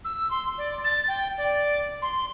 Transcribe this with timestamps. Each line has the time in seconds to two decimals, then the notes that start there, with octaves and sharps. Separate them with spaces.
0.05 E6
0.31 C6
0.58 D5
0.84 A6
1.08 G5
1.38 D5
2.02 C6